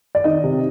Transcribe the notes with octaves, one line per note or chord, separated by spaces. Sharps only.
D5
D#3 D#5
C3